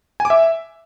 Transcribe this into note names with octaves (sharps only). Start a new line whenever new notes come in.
G#5
D6
E5